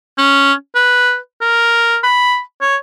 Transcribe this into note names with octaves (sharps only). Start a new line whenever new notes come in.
C#4
B4
A#4
B5
C#5